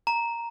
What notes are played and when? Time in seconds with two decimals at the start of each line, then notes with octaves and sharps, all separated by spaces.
0.07 A#5